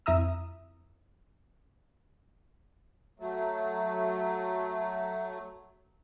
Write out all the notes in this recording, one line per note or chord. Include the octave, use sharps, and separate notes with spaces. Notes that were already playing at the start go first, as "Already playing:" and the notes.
F2 E4 E5 A#5 D#6 E6
F#3 A3